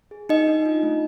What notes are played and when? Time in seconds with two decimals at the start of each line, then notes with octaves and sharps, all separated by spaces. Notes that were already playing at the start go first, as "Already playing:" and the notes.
0.11 G#4
0.29 D4 D#4 D#5
0.47 D4
0.66 F4
0.83 A3